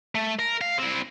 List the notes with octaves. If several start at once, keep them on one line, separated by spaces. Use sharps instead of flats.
A3
A#4
F5
C4 E4